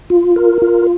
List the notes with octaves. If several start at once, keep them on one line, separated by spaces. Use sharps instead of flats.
F4
A#4
F4